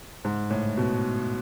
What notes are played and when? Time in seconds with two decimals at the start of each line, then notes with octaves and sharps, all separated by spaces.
0.24 G#2
0.51 A2
0.77 B2